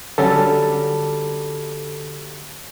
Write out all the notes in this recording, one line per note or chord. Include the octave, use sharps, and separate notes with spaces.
D3 F#3 G3 C#4 A4